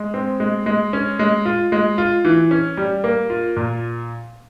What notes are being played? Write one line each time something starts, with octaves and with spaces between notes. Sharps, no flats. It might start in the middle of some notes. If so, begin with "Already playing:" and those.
Already playing: G#3
C4
G#3
G#3
C#4
G#3
F4
G#3
F4
E3
C#4
G3
A#3
F4
A#2